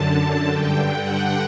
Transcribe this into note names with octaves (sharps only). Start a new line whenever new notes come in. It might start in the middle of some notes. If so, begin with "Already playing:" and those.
Already playing: F#2 D3 A5
G2 D3 G5
F#5